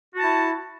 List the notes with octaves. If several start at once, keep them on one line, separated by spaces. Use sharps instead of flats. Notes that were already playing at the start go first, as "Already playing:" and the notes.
E4 F#4 A5